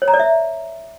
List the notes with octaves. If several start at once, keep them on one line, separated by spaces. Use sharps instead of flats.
C#5
A#5
D5
E5